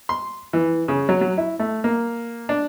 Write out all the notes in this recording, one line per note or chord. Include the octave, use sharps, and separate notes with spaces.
C6
E3
C#3
F#3
F#3
E4
A3
A#3
D4